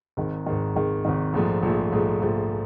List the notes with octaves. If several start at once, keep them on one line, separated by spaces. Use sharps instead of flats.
G#1 G#2 D#3
G#1 G#2 D#3
G#1 G#2 D#3
G#1 G#2 D#3
A#1 G#2 F3 A3
A#1 G#2 F3 A3
A#1 G#2 F3 A3
A#1 G#2 F3 A3